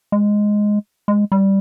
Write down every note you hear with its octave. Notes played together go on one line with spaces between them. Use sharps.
G#3
G#3
G3